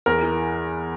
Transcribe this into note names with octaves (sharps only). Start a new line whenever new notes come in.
E2 A#4
E3